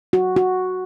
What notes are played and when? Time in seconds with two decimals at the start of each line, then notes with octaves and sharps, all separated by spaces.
0.13 F#4
0.36 F#4